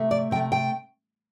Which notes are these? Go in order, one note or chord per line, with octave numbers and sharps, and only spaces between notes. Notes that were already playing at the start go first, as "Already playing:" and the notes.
Already playing: C3 A3
D5
C3 A3 G5
G5